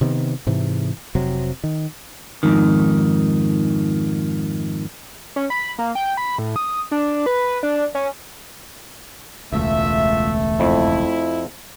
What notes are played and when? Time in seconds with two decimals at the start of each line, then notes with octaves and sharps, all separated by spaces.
0.01 C3 D#3 B3
0.47 G#2 C3 E3
1.15 F1 C3 F#3 C4
1.64 D#3
2.43 F2 G#2 D#3
5.36 C#4
5.50 B5
5.78 A#3
5.95 G5
6.17 B5
6.38 A2
6.56 D#6
6.91 D4
7.26 B4
7.63 D4
7.95 C#4
9.52 E1 C#2 A3 F4 E5
10.60 F2 E4